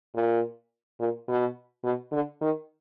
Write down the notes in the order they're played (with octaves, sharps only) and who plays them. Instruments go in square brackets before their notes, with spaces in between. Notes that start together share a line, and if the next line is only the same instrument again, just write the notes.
[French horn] A#2
A#2
B2
B2
D3
D#3